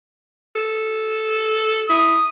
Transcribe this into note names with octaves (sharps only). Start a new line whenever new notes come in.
A4
E4 D#6